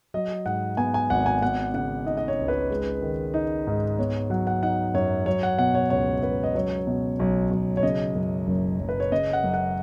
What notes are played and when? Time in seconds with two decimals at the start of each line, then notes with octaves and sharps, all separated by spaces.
0.14 F#3 D#5
0.46 G#2 F#5
0.77 B3 G#5
0.94 G#5
1.10 G#1 F#5
1.26 G#5
1.42 B3 F#5
1.74 C#3 F#5
2.06 D#4 D#5
2.17 D#5
2.28 C#5
2.39 C#2
2.48 B4
2.71 G#3
3.02 D#3
3.34 D#4
3.67 G#2
3.99 B3 C#5
4.30 F#3 F#5
4.47 F#5
4.63 D#4 F#5
4.94 F#2 C#5
5.26 F#3 C#5
5.43 F#5
5.58 B2 F#5
5.75 C#5
5.90 C#2 C#5
6.22 C#2 B4
6.44 D#5
6.55 F#3 C#5
6.87 B2
7.19 B1
7.51 B1
7.77 C#5
7.83 C#3 D#5
8.15 F#2
8.47 F#1
8.79 F#1
8.89 B4
9.00 C#5
9.12 C#3 D#5
9.33 F#5
9.44 F#2
9.54 F#5